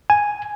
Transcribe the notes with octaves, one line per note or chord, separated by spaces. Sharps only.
G#5